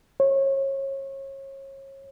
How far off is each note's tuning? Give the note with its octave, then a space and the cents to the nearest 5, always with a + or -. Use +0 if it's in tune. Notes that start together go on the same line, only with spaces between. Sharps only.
C#5 -30